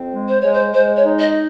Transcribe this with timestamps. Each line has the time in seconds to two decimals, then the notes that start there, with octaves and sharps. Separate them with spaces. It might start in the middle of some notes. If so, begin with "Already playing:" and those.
Already playing: F2 C4
0.13 G#3
0.28 C5
0.41 G#3 C#5
0.53 C5
0.74 G#3 C5
0.96 C#5
1.04 D#4
1.19 D#5